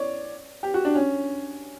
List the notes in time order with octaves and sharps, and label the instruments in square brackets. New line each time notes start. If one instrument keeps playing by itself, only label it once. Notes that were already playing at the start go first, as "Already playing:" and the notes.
Already playing: [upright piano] C#5 D5
G4
F#4
D4
C#4